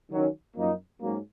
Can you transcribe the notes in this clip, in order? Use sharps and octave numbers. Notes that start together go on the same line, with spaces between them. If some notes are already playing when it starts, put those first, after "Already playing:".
D#3 F#3 C#4
F#2 F3 A#3 D#4
G#2 F#3 A#3 C#4